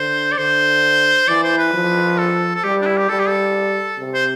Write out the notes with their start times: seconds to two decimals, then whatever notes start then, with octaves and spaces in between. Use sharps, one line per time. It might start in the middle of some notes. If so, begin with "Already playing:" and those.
Already playing: D3 C5
0.32 D5
0.38 D3 C5
1.28 E3 D5
1.43 C5
1.58 B4
1.74 F3
2.18 A4
2.55 A4
2.64 G3 G4
2.82 D4
2.86 E4
2.97 G4
3.09 G3 A4
3.19 G4
3.28 A4
3.98 C3
4.14 C5